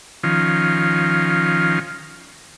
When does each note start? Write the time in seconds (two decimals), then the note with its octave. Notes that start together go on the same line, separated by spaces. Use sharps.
0.24 D#3 F3 C#4 F4